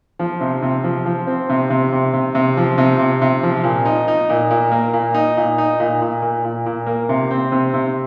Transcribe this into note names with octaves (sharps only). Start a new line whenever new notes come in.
F3
C3
C3
F3
F3
C4
C3
C3
C3
C3
C3
F3
C3
C3
C3
F3
A#2
D#4
D#4
A#2
A#2
A#3
A#2
D#4
A#2
D#4
A#2
A#2
A#2
A#2
A#2
A#3
C3
C4
C3
C3